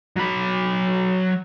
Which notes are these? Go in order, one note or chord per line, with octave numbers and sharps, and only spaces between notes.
F#3 B5